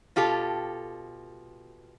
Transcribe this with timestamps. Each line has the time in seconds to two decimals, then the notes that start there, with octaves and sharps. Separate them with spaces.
0.16 B2 F4 G4 A4